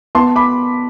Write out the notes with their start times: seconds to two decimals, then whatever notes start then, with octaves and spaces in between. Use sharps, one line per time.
0.15 B3 A5 C6
0.36 B5 D6